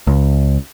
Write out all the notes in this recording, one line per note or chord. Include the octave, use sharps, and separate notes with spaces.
C#2